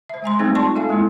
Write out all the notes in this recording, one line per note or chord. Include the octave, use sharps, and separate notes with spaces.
C5 E5
G#3 G#5 A#5 C6
G3 A3 C4 D#4 G#4 C5
D#4 F4 D5 A5 C6 C#6
A4 E5 F5 G#5
G#3 A#3 C4 E4 A4